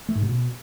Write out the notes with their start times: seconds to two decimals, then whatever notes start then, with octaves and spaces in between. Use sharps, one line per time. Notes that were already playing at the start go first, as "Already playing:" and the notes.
0.09 A3
0.15 G#2
0.22 C3
0.29 B2